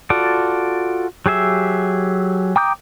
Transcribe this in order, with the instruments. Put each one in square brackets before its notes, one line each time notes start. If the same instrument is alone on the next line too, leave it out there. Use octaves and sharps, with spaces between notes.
[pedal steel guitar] F4 F#4 A4 D5
F#3 G4 G#4 E5
G5 A#5 D6 D#6 G6